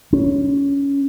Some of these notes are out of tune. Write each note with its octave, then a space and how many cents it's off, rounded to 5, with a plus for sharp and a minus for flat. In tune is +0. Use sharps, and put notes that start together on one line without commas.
C#4 +15